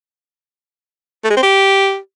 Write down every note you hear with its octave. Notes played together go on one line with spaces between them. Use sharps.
A3
G#3
C4
G4